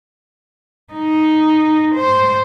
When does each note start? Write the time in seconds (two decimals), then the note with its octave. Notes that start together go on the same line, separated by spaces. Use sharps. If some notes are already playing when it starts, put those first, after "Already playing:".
0.93 D#4
1.95 C5